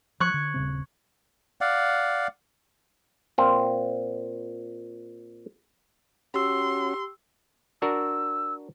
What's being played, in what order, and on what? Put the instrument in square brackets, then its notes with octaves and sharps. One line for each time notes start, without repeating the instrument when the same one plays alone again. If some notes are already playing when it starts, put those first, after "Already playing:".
[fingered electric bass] F3 [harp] C#6 F#6 G#6
[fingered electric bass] D3
D#1 C#3 C4
[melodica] D5 F5 F#5
[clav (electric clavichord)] A#2 C4 F4
[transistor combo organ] C#4 F#4 [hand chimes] G4 E6 [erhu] C6
[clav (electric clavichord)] D4 F#4 A#4 [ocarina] E6